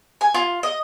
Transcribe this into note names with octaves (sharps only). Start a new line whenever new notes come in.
G#5
F4
D#5